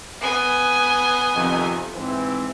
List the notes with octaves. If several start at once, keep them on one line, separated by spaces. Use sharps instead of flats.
B3 G#5
F2 C3 D#3
G#2 E3 C4